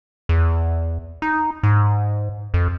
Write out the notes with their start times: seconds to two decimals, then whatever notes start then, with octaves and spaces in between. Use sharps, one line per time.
0.29 E2
1.22 D#4
1.63 G#2
2.54 F2